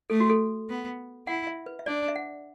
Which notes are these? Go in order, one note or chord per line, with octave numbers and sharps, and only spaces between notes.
A3 A4
F#4
A4
B3
E4 F#5
E5
B4
E5
D4 D5
E5
F#5